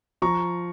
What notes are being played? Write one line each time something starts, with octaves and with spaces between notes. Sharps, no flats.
F3 A#5 C#6